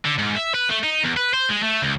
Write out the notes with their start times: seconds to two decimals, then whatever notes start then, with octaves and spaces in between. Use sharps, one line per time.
0.05 D3
0.18 G#2
0.36 E5
0.54 B4
0.70 A3
0.83 D#4
1.04 E2
1.17 B4
1.34 C5
1.50 G#3
1.63 A3
1.82 C#2